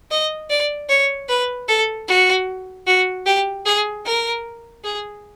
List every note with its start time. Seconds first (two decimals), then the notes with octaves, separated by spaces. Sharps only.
0.11 D#5
0.49 D5
0.89 C#5
1.29 B4
1.68 A4
2.08 F#4
2.87 F#4
3.26 G4
3.65 G#4
4.05 A#4
4.84 G#4